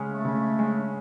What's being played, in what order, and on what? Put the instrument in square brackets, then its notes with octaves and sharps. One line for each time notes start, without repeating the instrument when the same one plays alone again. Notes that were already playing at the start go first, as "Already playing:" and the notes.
Already playing: [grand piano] C#3 G#3 C#4
[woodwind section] A3
[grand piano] C#3
G#3 C#4